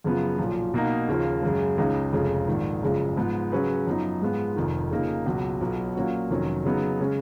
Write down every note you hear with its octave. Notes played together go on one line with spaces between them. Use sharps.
F#2 C#3 F3 B3
B1 A#2 F3
B2 A#3 D#4
D#2 C#3 F3 A#3
F#2 C#3 G#3
C#2 C#3 G#3 D#4
F1 F2 C#3 G#3
A#1 G#2 D#3
F#1 F#2 C#3 F3 G#3
G#2 F3 B3
C#3 F#3 C#4 G#4 B4
F#2 F3 B3 D#4
G#2 F3 G#3 B3 F4
F1 F2 D#3
C#3 F3 A#3 D#4 G#4
C#2 B2 F#3
B1 B2 F#3 B3 F4
A#2 F#3 A#3 C#4 F#4
F1 F2 D#3 F#3 C#4
C#3 F#3 B3 D#4
C#3 G#3 C#4